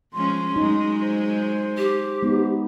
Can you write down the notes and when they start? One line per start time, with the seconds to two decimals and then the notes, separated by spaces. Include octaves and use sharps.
0.13 F3 G#3 C#4 C6
0.56 F#3 G#3 D#4
1.01 C5
1.77 G4
2.22 G#3 B3 D#4